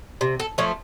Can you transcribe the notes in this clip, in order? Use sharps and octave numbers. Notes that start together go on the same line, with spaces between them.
C3
A4
F3 A3 C#5